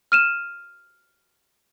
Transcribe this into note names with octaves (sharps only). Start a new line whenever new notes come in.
F6 D#7 E7